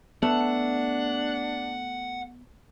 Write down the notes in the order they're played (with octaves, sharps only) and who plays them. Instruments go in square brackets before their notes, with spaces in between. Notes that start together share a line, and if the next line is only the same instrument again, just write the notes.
[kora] A3 [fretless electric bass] B3 [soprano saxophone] D4 [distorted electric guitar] F#5